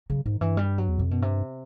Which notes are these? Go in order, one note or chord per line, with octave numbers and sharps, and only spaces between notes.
C#3 F#3
G#2 D#3
G2 E3
G3
F#3
E2
F2 C3
F#2 B2
G2 C3